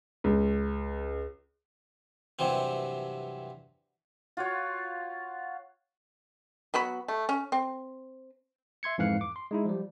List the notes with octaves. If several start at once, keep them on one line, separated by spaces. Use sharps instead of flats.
C#2
G2 C3 E3 F#3 C4
F4 F#4 C#5
F#3 B3 F#4 B5
A3
C#4
C4
E5 C6 G#6 C#7
F2 G#2 E3 F5 F#6 C#7
D6
C6
G#3 D#4 E4
F3 G3